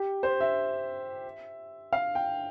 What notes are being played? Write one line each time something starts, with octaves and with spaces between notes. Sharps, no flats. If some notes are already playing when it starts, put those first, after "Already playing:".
Already playing: G4
C5
E5
F5
G5